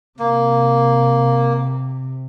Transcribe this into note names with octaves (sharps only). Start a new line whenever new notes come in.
C3 A#3